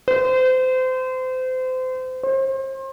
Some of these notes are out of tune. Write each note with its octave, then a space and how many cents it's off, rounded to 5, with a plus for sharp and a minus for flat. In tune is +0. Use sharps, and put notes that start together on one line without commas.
C5 -30
C5 +35